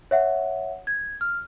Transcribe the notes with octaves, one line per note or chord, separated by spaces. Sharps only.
C#5 E5 F#5
G#6
F6